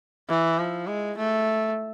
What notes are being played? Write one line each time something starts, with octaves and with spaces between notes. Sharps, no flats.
E3
F3
G#3
A3